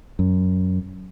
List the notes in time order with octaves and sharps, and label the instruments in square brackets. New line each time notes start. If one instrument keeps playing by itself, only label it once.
[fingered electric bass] F#2